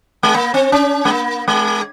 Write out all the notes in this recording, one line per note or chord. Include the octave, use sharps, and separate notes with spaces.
G#3
A#3
C4
C#4
G#3
A#3
G#3